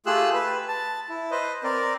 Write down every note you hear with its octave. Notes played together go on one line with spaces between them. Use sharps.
A3 F4 G4 G#4 E6 F#6
B4
A5
E4
B4 C5 D#5
C4 A#4 D5